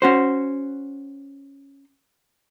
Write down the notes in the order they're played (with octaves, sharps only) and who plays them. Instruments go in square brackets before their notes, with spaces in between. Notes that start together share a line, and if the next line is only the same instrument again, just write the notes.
[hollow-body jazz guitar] C#4 F#4 C5